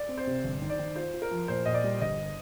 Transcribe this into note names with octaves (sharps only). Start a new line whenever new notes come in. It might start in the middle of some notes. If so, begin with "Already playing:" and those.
Already playing: D5
C4
C5
C3
G1
D#3
D5
D#3
F4 C5
F4
A#4
F3
A#2 C5
A#2 D#5
D5
G3
G1 D#5